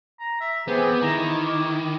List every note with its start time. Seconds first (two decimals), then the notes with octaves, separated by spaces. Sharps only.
0.19 A#5
0.41 E5
0.68 E3 B3 C4 G4 G#4
1.03 D#3 E4 A#5
1.20 D6